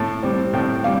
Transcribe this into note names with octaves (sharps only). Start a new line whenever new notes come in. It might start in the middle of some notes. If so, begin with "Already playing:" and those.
Already playing: A2 A5
G3 C4
A2 G5
G3 F5